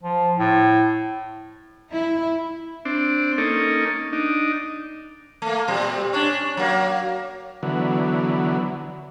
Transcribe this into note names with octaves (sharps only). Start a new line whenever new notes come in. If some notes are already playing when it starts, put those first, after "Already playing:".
F3
A2
E4
C4 D4
A#3 C#4 D#4 A4
D4 D#4
A3 A#3
A#2 G3 C4
C#4 D4
F#3 A#3
D3 E3 F#3 B3